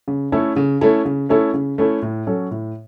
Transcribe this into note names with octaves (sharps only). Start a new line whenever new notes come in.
C#3
A3 C#4 E4 A4
C#3
A3 C#4 E4 A4
C#3
A3 C#4 E4 A4
C#3
A3 C#4 E4 A4
A2
F#3 C#4 A4
A2